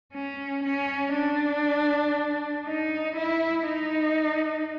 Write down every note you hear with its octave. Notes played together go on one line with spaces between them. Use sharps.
C#4
C#4
D4
D#4
E4
D#4